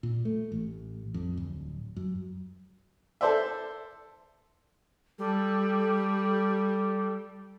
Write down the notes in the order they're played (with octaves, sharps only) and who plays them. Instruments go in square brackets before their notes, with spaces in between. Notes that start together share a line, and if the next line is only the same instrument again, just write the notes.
[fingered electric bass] A#2
A3
A1
F2
D1
F#2
[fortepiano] A4 C5 D5 E5
[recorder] G3 [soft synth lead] A4